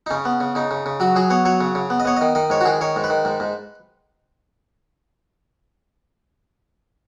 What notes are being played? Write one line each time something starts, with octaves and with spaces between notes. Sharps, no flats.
D#4
C#3 C#4
B3
C#3
C#3 D#4
C#3
C#3
F#3 F#4
F#3 G#4
B3 C#5
F#3 C#5
C#3
C#3
B3
D#5
B3 C#5
D#3 D#5
D#3 D#5
G#2 C#5
F#4
D#3 G#4
D#3 C#5
G#2
B4
D#3
G#2
G#2